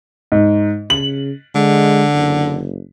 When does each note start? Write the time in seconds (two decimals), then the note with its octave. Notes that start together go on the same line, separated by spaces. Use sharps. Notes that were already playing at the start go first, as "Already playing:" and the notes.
0.32 G#2
0.90 C#3 F#7
1.55 D3 G#3
2.14 F#1